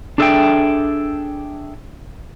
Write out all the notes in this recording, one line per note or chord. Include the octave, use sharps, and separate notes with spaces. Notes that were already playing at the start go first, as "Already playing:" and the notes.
D4 G#4 A4 D#5 E5 G5